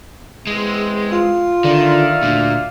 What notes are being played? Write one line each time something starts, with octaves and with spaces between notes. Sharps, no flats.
E2 G#3 C4
F4
D3 D#3 D5 E5 F5
D2 A#2